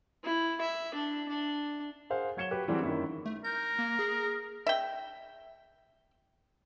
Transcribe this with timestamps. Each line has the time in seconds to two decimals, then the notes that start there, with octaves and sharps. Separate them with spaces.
0.24 E4
0.61 E5
0.94 D4
1.28 D4
2.10 G#4 A#4 C5 F5 F#5
2.37 F#3 C#5 G#6 C#7 E7 G7
2.51 F#4 G4 B4
2.68 E3 F#3 G3 C4 E4 G#4
2.82 F#2 D#3 A#3 E4 C#6
3.25 A3
3.44 A#4 G6
3.79 A#3
3.99 G#4
4.67 E5 G5